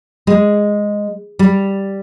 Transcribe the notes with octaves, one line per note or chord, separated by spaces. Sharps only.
G#3
G3